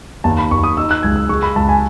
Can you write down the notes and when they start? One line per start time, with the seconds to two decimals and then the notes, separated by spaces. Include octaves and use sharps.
0.24 D#2 A5
0.38 B5
0.51 D#2 C#6
0.64 D#6
0.77 D#4 E6
0.91 F#6
1.03 C#2 G#6
1.16 E6
1.29 G#3 C#6
1.43 B5
1.56 C#2 A5
1.69 G#5